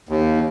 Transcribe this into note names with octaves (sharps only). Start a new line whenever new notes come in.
D#2